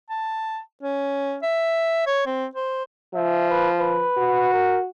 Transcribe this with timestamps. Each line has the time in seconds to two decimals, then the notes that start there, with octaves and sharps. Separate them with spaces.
0.10 A5
0.83 C#4
1.43 E5
2.07 C#5
2.27 C4
2.55 C5
3.14 F3 E5
3.50 B4
3.80 B4
4.17 F#4
4.53 A#4